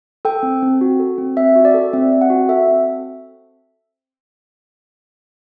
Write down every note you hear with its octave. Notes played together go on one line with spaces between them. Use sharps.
A4 G5
C4
C4
F#4
A4
C4
C4 E5
F#4
D5
A4
C4 E5
C4
F#5
F#4
A4 E5
C4